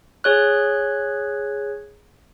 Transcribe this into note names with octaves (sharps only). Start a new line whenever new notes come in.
G#4 C#5 F#6